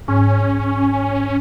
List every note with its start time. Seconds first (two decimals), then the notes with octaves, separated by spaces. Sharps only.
0.08 G#2 C#4